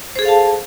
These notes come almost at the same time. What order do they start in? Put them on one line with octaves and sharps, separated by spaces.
C5 G#4 A4 F5 A5